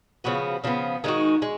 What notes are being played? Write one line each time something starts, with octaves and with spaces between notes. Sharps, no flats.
C#3 F3 B3 F#4
C#3 F3 B3
D#3 G#3 D#4 F#4
G#3